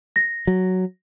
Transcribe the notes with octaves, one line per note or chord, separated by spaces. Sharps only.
A#6
F#3